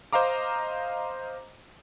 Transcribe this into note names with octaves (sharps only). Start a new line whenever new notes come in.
C5 D#5 F5 A#5 D6